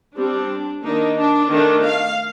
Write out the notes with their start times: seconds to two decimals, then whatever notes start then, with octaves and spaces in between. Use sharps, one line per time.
0.17 G3 C4 D4
0.83 D#3 A#3 D4 D#4
1.17 D4
1.50 D#3 A3 D4
1.83 F5